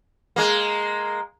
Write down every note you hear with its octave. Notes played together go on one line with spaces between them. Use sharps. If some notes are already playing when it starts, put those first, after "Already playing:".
G#3 A#3